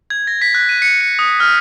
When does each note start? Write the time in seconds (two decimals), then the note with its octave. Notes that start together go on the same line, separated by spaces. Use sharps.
0.10 G#6
0.27 A#6
0.42 B6
0.54 F#6
0.69 D#7
0.82 C#7
1.01 C#7
1.19 D#6
1.40 F6